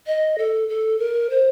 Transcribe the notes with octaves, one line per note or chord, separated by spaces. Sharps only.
D#5
A4
A4
A#4
C5